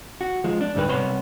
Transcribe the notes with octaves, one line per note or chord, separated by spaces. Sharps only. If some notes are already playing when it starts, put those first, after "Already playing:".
F#4
F3 G#3
D4
D2 G#2 G3 G4 B4
C2 B2 B3 C#5 B5 C6